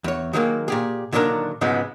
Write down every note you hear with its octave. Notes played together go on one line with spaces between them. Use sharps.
E2 C#5
D#3 F#3 G#3 A#3
A#2 G4 G#4
A#2 D3 D#3 F#3 D4 A#4
G#2 C#3 F3 F#3 G#3 B3